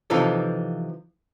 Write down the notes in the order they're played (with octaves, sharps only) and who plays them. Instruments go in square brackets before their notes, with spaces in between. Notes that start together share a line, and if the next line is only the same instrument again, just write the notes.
[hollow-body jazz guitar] C3 E3 F3 D#4 F4 A4